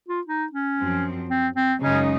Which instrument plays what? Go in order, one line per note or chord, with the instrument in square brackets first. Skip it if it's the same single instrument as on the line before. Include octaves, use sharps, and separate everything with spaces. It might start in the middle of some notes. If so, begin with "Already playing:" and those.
[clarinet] F4
D#4
C#4
[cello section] F#2 F3 C4
[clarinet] C4
C4
[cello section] F#2 C#3 G#3 D#4 [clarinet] C#4